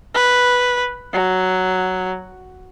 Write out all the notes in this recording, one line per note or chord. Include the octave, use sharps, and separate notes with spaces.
B4
F#3